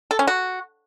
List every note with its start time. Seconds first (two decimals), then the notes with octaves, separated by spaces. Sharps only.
0.11 A4
0.19 C#4
0.27 F#4